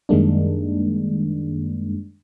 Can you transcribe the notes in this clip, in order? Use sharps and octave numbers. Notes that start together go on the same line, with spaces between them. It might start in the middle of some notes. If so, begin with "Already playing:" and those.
F#2 D#3 G3 G#3 A#3 D4